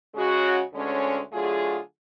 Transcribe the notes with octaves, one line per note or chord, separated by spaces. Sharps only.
C#3 G#3 C#4 F#4
D2 D3 G#3 C#4
D3 F#3 A3 F4 G#4